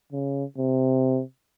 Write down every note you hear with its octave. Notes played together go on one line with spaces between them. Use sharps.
C#3
C3